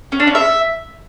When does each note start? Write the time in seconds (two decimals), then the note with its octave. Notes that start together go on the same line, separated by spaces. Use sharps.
0.12 C#4
0.20 D4
0.27 C#4
0.35 E5